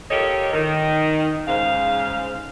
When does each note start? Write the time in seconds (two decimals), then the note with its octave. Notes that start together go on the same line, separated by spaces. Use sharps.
0.11 F4 G4 A4 A#4 C#5 D#5
0.54 D#3
1.48 G#2 C#3 C5 F5